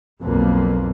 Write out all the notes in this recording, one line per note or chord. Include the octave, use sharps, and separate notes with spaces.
B1 F2 A#3